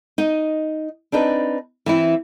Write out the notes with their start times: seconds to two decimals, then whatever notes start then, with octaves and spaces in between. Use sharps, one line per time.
0.18 D#4 D#5
1.12 C4 D4 D#4 B4
1.86 E3 C4 E4